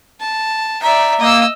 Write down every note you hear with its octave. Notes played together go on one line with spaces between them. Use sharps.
A5
D5 E5 A#5
A#3 D#5 E6